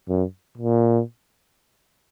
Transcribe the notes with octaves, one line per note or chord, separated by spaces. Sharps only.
F#2
A#2